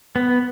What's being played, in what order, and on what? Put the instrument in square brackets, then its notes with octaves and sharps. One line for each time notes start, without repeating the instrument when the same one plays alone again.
[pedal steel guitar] B3